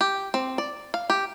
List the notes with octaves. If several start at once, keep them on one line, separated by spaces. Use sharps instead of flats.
G4
C4
D5
F5
G4